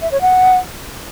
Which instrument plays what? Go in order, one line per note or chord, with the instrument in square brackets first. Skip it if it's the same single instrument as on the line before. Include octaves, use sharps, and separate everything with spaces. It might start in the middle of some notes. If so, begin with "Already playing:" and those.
[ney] E5
C#5
F#5